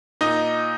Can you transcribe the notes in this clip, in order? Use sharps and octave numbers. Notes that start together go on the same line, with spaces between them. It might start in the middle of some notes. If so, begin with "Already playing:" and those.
A#2 D#4 D#5